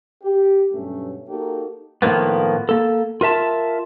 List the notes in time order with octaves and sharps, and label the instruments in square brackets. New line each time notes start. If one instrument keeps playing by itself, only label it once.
[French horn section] G4
G2 B2 F#3 A3 C#4
A#3 D#4 F#4 G4 A4 A#4
[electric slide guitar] A2 D#3 F3 A#3 B3
A#3 A4
F4 A#4 E5 A5